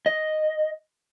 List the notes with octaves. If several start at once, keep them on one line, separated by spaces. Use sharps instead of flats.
D#5